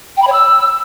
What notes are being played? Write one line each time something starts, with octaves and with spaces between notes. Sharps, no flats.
G5
B5
C#5
E6